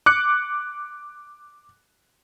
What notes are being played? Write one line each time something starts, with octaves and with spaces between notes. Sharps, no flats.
D6 F#6 C#7